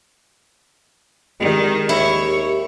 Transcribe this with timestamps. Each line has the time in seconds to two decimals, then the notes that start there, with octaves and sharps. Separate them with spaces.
1.40 D#3 G#3 G4 D5
1.89 D#2 E4 C#5